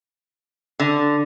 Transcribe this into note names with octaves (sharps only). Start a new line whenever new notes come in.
D3